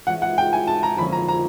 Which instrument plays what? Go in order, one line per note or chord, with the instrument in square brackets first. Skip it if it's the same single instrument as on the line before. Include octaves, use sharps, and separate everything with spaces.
[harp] E3 G#3 C#4 F4 G#4 [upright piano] F#5
[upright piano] F#5
G5
G#5
A5
A#5
[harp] F2 D3 F3 A#3 C#4 [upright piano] B5
[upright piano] A#5
A#5